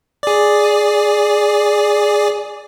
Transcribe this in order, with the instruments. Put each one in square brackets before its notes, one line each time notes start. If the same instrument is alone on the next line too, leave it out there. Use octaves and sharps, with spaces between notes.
[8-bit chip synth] G#4 D5